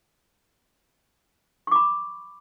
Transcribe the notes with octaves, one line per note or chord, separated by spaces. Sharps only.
B5 C#6 D6